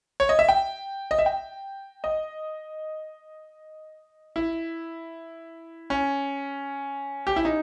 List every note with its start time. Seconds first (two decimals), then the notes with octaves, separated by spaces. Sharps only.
0.20 C#5
0.29 D#5
0.39 E5
0.49 G5
1.11 D#5
1.19 E5
1.26 G5
2.04 D#5
4.36 E4
5.90 C#4
7.27 G4
7.36 E4
7.45 D#4